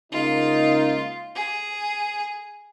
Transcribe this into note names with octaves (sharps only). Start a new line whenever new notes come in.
C#2 C#3 A#3 D#4 F4
G#4